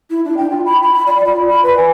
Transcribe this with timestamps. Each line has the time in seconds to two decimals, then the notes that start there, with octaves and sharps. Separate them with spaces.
0.11 E4
0.25 D4
0.37 G5
0.50 F4
0.66 B5
0.83 B5
0.94 B5
1.07 D5
1.25 F4
1.48 B5
1.63 B4
1.77 G#5